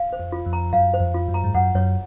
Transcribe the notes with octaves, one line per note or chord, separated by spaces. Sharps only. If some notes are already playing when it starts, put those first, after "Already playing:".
Already playing: F5
C5
F2
F4
F2
A#5
F#2 F5
C5
F2
F4
F#2
A#5
G#2
F#2 F#5
F#2 C#5